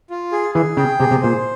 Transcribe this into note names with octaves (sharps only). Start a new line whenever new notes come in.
F4
G#4
E3 G#4
C#3 G5
C3 G#4
C3
A#2 C5